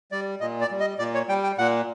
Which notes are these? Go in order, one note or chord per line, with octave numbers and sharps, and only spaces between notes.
G3 D5
A#2 D#5
D5
G3
D#5
A#2 D5
C#5
G3 G5
G5
A#2 F#5